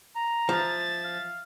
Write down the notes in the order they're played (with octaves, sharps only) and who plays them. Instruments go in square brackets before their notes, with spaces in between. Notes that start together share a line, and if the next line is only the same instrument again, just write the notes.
[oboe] A#5
[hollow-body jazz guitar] F3 [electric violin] E5 A6
[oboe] F5